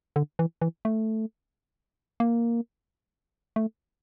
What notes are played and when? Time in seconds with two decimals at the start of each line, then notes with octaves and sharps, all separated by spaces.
0.16 D3
0.39 E3
0.62 E3
0.85 A3
2.20 A#3
3.56 A3